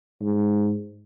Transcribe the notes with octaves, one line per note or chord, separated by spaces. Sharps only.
G#2